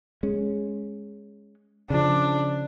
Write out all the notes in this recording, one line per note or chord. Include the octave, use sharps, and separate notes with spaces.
G#3 C#4
C#3 F3 D4